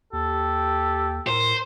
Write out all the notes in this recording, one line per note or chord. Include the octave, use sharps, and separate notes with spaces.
D#2 G4 A4
A2 A#4 C5